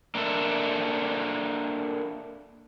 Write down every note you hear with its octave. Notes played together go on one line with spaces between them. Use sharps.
A#3 D4 A4 E5